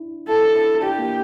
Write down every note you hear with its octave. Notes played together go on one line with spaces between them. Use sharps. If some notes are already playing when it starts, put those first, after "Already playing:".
Already playing: D4 E4
E4 A4
D4
E4
D4 G4
A#3